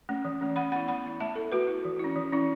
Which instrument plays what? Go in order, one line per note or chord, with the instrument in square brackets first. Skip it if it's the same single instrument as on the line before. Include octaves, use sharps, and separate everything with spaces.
[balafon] A3 C#4
E3
A3 C#4
E3 F#5 B5
B3 E4 F#5 B5
E3 F#5 B5
B3 E4
A3 E5 A5
E4 A4
A3 F#4 B4
E4
E3
C#4 E4
E3
C#4 E4